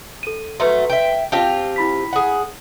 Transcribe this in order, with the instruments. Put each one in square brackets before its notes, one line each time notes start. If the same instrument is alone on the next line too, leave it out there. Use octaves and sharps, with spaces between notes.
[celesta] A4 D#7
[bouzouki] F#3 A3 [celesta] B4 C6
[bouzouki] E5 G5
[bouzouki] C4 F4 G4 [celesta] A5
[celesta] E4 B5 B6
[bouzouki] G#4 F#5